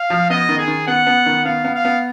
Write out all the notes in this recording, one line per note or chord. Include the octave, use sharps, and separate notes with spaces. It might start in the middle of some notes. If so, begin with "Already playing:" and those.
Already playing: F5
F3
B3 D#5
D#3
G#4
D#3
B3 F#5
B3
D#3
B3 F5
B3
F5
B3